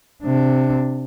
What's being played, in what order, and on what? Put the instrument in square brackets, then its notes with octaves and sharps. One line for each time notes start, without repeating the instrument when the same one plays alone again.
[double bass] C3 D4